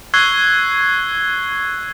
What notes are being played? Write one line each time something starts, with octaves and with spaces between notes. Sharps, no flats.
C#6 E6 F#6 G#6 C7 G7